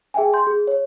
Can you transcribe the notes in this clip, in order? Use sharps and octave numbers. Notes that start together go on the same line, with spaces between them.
G#4 E5 G5 G#5
C6 G6
G#4
C#5